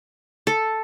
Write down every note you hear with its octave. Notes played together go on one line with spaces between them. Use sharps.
A4